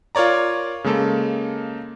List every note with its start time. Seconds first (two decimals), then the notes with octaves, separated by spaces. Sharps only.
0.15 F4 A#4 C#5 D5 A#5
0.84 C#3 G#3 A#3 A4